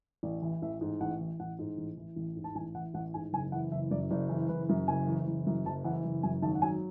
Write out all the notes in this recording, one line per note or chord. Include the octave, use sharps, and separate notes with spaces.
A1 D5
E3
A1 E5
G#2
A1 F#5
E3
A1 F#5
G#2
A1
E3
A1
G#2
A5
A1 G#5
E3 F#5
A1 F#5
G#2 G#5
F#1 G#5
E3 F#5
F#1 E5
F#2 D5
F#1 D5
E3
F#1 B4
F#2
F#1 G#5
E3
F#1
F#2
F#1 A5
E3 F#5
F#1
F#2 G#5
G#1 A5
F#5
F#3 G#5